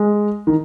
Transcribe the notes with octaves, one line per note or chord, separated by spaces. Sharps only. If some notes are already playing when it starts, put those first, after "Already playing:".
Already playing: G#3
D#3